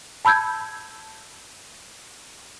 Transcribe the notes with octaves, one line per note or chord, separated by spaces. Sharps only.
A5 B5 E6 G6 G#6